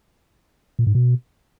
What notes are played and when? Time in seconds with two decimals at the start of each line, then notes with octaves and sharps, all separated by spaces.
0.79 A#2
0.87 G#2
0.95 B2